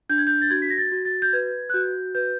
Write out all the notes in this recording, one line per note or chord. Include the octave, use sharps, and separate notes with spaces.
D4 G6
G#6
G6
A6
F#4 G#6
B6
A#6
A6
F#4
A6
G6
B4 G#6
F#6
F#4 G6
B4 G6